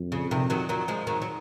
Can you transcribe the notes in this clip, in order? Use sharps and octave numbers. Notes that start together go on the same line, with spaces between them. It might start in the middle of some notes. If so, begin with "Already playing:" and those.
Already playing: F2
C#3
C3 D#3
D#3 F#3
D#3 F#3
F3 G#3
D#3 F#3
F#3